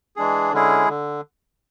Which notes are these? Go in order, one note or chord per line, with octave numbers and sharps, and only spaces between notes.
E3 G#3 D4 G#4
D3 G#3 C#4 E4 G#4
D3